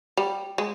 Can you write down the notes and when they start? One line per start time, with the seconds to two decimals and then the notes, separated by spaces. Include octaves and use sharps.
0.17 G3
0.58 G#3